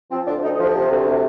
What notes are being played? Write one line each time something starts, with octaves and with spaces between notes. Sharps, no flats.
F3 C4
D2 D4
D2 D#4
D#4
F3
G4
C3
D2
C3